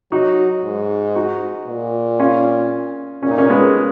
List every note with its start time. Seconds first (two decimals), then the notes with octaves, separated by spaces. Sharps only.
0.12 F#3 D#4 F#4
0.63 G#2
1.16 D#4 F#4
1.67 A#2
2.19 C#4 F4
3.23 A#2 C#4
3.31 D#4
3.38 A#3 C#4
3.49 G#3 B3